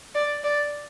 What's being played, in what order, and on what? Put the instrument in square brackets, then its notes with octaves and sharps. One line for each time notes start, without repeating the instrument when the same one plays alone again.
[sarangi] D5
D5